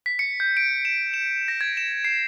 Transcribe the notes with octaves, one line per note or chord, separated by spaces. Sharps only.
B6
C#7
G6
D7
E7
E7
A#6
G#6
E7
C7